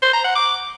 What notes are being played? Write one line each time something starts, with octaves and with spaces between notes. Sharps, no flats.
C5
A#5
F#5
D6